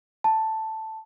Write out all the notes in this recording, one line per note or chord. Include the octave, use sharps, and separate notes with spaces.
A5